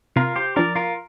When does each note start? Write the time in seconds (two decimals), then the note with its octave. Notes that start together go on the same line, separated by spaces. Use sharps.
0.16 C3 F4 A#4
0.36 G4 C5
0.56 F3 D4 A#4 D5
0.75 F4 A#4